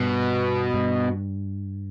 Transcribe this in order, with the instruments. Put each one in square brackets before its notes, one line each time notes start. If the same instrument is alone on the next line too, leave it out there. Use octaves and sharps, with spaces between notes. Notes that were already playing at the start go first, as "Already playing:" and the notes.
Already playing: [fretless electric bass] G2 [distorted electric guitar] B2
[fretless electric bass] G2